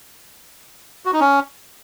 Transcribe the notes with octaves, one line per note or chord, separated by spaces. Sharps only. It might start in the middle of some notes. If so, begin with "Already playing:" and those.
F#4
D#4
C#4